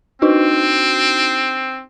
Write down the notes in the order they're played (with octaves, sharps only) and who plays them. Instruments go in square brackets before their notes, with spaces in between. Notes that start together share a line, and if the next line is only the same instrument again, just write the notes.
[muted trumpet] C4 [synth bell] D4 D#4 F#4